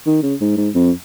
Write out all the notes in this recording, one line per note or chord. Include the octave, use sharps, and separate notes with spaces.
D#3
C#3
G#2
G#2
F2